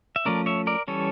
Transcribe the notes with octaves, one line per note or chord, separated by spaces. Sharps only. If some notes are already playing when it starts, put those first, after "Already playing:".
E5
F3 A3 C#4 A#4 D5
C#5 E5
A#4 D5
E3 G3 C#4 A4 C#5